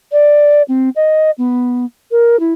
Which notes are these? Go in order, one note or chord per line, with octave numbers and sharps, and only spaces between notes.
D5
C4
D#5
B3
A#4
E4